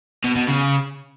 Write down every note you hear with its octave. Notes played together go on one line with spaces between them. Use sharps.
B2
B2
C#3